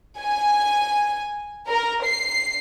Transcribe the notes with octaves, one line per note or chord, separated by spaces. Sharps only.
G#5
A#4
C7